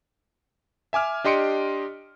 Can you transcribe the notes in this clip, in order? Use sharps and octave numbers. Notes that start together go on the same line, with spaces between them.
E5 G#5 D6 F6
D4 G4 D#5 C6 C#7 D7